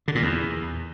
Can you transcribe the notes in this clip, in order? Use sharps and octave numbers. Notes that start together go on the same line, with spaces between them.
D3
A#2
E2